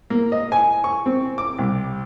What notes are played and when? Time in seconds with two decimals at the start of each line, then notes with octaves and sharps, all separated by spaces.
0.10 A#3
0.32 D#5
0.52 G#5
0.84 C#6
1.06 C4
1.38 D6
1.58 C2